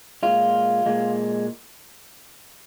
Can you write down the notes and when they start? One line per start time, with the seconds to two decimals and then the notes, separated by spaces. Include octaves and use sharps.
0.23 A#2 G#3 F4
0.86 A#2 G#3